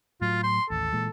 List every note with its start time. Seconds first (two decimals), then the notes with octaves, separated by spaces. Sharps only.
0.21 A2 F#3 F4
0.43 C6
0.70 A1 D#2 A4
0.93 A#2 E3 G#3